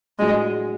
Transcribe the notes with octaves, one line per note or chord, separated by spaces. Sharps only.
A2 F#3 G#3 A3 D4